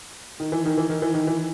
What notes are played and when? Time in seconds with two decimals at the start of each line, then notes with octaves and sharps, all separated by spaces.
0.40 D#3
0.52 E3
0.66 D#3
0.78 E3
0.90 D#3
1.02 E3
1.14 D#3
1.27 E3